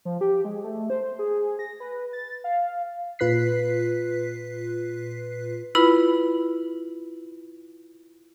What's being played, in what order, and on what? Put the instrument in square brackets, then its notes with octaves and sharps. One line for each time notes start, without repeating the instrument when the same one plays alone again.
[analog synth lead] F3
G4
G#3
A3
C5
G#4
A#6
B4
A6
F5
[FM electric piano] A#2 F4 B4 F#6 B6 C7
[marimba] E4 F4 B4 B5